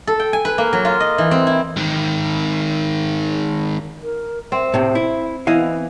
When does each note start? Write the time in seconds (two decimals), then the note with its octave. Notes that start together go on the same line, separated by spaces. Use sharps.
0.07 A4
0.20 G5
0.33 G#5
0.45 B4
0.58 A#3
0.73 F#3
0.85 F4
1.00 D#5
1.18 E3
1.31 C4
1.47 E4
1.77 G#2 D#3
4.03 A#4
4.52 C4 E5
4.74 A2 C3
4.95 E4
5.47 E3 B3 D#5 F5